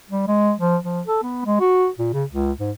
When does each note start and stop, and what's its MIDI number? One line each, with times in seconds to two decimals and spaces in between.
0.10 0.26 55
0.27 0.52 56
0.59 0.77 53
0.83 1.01 53
1.07 1.19 69
1.23 1.44 59
1.45 1.57 56
1.60 1.88 66
1.99 2.09 46
2.13 2.24 49
2.31 2.52 37
2.59 2.71 44